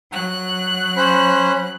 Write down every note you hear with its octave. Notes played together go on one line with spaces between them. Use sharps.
F#3 F#6
C#4 C5 B5